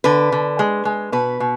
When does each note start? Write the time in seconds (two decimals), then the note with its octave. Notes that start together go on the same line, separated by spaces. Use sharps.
0.04 D3 B4
0.32 D3
0.59 G#3
0.85 G#3
1.12 B2 B4
1.40 B2